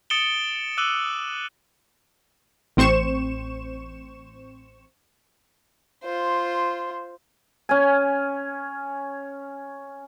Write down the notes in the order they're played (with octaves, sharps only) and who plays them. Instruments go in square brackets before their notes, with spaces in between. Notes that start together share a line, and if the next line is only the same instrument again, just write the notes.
[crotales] D#6 A6 C#7 D7 E7 G7
D6 E6 F#6 D#7 F#7 G7
[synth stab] A1 C4 C5 C#6 E7
[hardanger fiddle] F4 C5
[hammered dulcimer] C#4 G#5